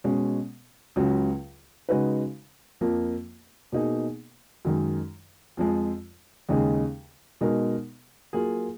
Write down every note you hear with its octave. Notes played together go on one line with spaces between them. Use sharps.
B2 G#3 C#4
C#2 C#3 F#3
C#3 G#3 D#4 F#4 B4
F2 F3 A#3
B2 A#3 D#4 G#4
F#2 D#3 G#3
F2 F3 G#3
D#2 C#3 G#3 D#4 G#4
B2 G#3 D#4 A#4
F#3 A#3 F4 G#4